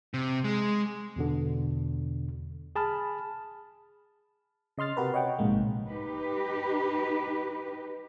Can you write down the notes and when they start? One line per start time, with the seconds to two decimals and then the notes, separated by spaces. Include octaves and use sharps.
0.14 C3
0.44 G#3
1.16 E2 B2 D3
2.76 G#4 A5 B5 F6
4.78 C#3 D#5 C6 F6 A6
4.97 C3 F#4 G4 A#4 B4
5.14 C#5 D#5 F#5 G5
5.39 A#1 G#2 C3 G#3 A#3
5.89 D#4 G4 B4